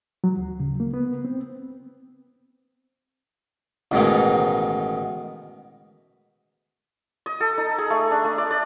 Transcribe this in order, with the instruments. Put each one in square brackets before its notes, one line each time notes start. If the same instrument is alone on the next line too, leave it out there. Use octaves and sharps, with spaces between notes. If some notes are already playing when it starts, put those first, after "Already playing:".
[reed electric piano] F#3
D2
C#3
A#3
B3
C4
[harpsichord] A1 G#2 B2 D#3
[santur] D#5
A4
D#4
G#4
A3
D4
A3
D5
D5